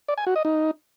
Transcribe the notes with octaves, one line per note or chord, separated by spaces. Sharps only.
D5
G#5
F#4
D#5
D#4